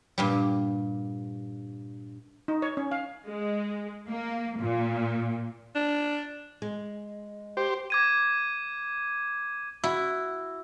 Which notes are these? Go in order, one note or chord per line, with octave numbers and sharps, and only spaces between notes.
G2 A#2 G3
D#4
C#5
C#4
F5
G#3
A#3
A#2
D4
G#3
G4 C5
D6 G#6 D#7
E4 F#4 E6